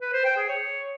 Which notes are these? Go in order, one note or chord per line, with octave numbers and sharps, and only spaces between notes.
B4
C5
G5
G#4
C#5